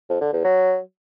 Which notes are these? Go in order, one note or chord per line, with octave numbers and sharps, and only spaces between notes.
F2
D3
E2
F#3